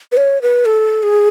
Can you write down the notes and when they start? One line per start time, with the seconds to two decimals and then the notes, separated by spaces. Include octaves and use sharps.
0.12 B4
0.17 C#5
0.42 B4
0.65 A4
1.03 G#4